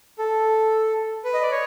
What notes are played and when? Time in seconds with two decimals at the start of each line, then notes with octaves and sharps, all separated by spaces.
0.18 A4
1.24 B4
1.34 D#5
1.42 D5
1.51 C#5